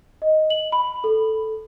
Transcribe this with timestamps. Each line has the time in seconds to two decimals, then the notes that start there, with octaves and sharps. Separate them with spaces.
0.22 D#5
0.50 F#7
0.72 B5
1.04 A4